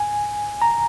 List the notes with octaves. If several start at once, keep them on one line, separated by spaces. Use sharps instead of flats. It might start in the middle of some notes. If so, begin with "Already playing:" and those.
Already playing: G#5
A#5